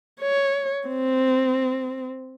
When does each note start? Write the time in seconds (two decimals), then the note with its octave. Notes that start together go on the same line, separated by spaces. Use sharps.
0.21 C#5
0.88 C4